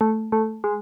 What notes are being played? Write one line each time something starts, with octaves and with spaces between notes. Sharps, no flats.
A3
A3
G#3